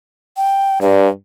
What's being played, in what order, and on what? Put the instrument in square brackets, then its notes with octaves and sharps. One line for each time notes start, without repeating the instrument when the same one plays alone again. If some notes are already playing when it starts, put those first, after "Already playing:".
[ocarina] G5
[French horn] G2 [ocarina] D5